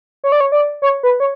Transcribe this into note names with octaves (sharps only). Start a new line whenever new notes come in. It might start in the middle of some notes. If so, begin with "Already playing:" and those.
C#5
D5
C#5
D5
C#5
B4
C#5